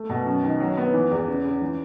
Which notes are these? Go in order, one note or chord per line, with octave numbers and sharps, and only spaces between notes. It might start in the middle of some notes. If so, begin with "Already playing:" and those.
Already playing: A3
B2
F#2
D#3
F#3
B3
E3
E2
C#3
C#3
E3